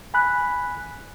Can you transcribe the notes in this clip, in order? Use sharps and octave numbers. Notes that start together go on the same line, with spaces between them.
G#5 B5 F#6